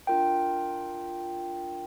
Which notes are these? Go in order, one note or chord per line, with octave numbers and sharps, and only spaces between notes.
D4 F4 A#4 G5